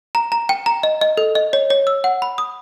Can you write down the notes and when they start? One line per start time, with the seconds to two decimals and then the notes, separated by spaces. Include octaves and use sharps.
0.15 A#5
0.32 A#5
0.49 G5
0.66 A#5
0.83 D#5
1.01 D#5
1.17 A4
1.35 D#5
1.53 C#5
1.70 C#5
1.87 E6
2.04 F#5
2.22 B5
2.38 D#6